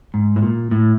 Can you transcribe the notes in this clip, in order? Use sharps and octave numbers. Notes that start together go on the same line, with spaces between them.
G#2
A2
A#2
A2